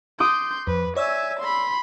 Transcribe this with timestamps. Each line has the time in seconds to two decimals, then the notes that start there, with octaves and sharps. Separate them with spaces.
0.20 C6 D6 D#6 G6 D#7
0.67 F2 B4
0.96 C#5 D5 E5 G#5 E6
1.40 B5 C6